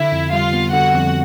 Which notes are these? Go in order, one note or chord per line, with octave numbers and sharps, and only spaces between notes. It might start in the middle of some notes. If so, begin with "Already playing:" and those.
Already playing: D3 E4 E5
F2
G3 F4 F5
B3
D3 F#4 F#5
F2